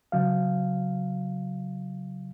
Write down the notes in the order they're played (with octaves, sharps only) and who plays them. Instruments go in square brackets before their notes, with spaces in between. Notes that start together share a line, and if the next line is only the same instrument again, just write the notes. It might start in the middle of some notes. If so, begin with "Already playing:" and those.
[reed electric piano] C#3 F#3 F5